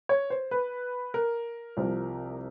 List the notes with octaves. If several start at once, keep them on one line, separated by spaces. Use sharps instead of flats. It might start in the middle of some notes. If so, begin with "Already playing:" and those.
C#5
C5
B4
A#4
C2 C3 F3